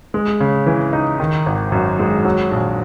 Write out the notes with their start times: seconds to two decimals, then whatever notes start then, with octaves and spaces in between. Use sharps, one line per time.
0.14 G#3
0.40 C#3
0.66 E3
0.93 D#4
1.20 D#3
1.46 G#1
1.72 F#2
1.99 G#3
2.25 F#3
2.51 A#1